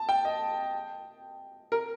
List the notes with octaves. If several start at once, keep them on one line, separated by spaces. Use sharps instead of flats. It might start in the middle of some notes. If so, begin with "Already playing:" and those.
Already playing: A5
G5
D#5
A#4